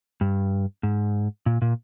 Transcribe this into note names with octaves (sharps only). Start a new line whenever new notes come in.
G2
G#2
A#2
A#2